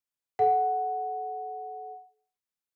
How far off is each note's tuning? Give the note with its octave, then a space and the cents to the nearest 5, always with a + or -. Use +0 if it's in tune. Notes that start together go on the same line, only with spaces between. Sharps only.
A4 -30 F#5 +0